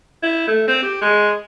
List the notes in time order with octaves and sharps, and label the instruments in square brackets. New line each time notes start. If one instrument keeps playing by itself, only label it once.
[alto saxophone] E4
A3
C4
G4
G#3